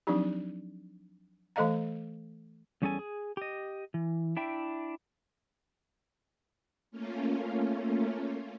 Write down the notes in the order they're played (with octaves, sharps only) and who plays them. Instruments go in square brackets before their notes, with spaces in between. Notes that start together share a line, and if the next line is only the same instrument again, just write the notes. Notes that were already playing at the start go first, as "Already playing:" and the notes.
[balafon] F3 F#3 C4 D4 D#4 G4
E3 A3 A4 D#5 F5 A#5
[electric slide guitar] E2 G3 C#4 G#4 A4 G#5
G#4
G4 D#5
E3
D4 E4 E5 G5
[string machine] A3 A#3 C#4 F4